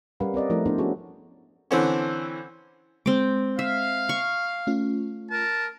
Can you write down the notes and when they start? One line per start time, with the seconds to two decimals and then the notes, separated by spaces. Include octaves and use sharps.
0.20 G3 C#4 A#4 B4 F5 F#5
0.34 C4 A#4 D5 D#5
0.50 F3 A3 E4 A#4
0.66 B3 D4 E4 C5
0.78 C#4 F#4 G#4 A4
1.71 D3 E3 C4 C#4
3.06 G#3 C4 D6
3.59 E5 F5
4.09 C#6
4.67 A3 C#4 F4
5.30 A#4 A5